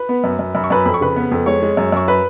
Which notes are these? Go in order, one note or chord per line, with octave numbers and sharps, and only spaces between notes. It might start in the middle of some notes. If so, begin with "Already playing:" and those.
Already playing: B4 B5
B3
F#2
F#2
F#2 B5
C#6
F#2 B4 B5
F2 B5
C#6
C#3 B4 B5
B3
F2
G#3 C#5 C#6
G#3
F#2
F#2 C#6
B4 B5